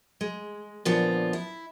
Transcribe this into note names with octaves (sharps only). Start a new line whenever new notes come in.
G#3
A#2 D3 F3 B3 F4
E4